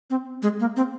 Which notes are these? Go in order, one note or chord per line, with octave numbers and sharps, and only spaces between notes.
C4
G#3
A#3
C4